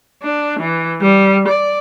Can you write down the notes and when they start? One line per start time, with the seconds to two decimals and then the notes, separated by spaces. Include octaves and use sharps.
0.23 D4
0.60 E3
1.01 G3
1.48 D5